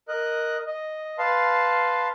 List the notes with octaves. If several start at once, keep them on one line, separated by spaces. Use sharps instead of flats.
A#4 D#5 F#6
D#5
B4 F5 A5 C6